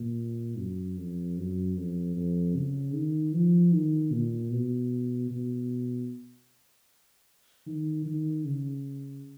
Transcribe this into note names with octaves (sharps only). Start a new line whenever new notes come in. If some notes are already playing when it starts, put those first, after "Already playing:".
Already playing: A#2
F#2
F2
F#2
F2
F2
C#3
D#3
F3
D#3
A#2
B2
B2
D#3
D#3
C#3